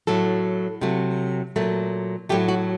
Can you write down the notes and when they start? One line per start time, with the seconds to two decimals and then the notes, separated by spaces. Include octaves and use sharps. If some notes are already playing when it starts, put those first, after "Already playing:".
0.07 A2 F#3 A3 A4
0.81 C3 F#3 A3
1.56 A#2 F#3 A3
2.29 A2 F#3 A3 G4
2.48 F#4